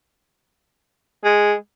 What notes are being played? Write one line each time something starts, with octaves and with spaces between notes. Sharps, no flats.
G#3